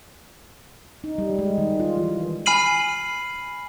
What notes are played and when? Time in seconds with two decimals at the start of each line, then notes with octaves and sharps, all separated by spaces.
1.04 D#4
1.18 G3
1.39 G#3
1.58 D#3
1.80 F4
1.97 E3
2.46 G#5 B5 F6 C7 D#7 F#7